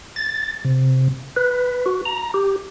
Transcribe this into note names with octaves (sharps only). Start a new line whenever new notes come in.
A6
C3
B4
F#4
A#5
G4